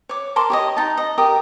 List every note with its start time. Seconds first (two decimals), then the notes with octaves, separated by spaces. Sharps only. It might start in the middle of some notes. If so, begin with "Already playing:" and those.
0.09 C#5 D6
0.36 A#4 A5 C6 D6
0.50 G4 C#5 D#5
0.77 D#4 A5
0.97 D#5
1.18 G4 A#4 D#6